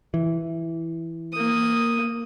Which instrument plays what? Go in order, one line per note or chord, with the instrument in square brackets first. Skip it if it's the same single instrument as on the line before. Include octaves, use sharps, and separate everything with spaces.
[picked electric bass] E3
[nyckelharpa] A#3 D#6